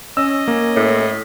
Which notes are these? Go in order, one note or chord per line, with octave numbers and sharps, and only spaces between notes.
C#4 D#5 E6
A#3
A2